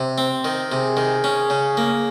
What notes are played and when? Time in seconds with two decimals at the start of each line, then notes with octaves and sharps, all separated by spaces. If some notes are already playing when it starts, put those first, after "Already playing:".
Already playing: C3
0.18 C4
0.45 D#3
0.71 C3 G#4
0.97 D#3
1.24 C#4
1.50 C#3
1.77 A#3